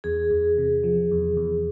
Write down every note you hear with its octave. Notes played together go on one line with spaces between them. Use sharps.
E2 G#4
E2
C3
F3
E2
E2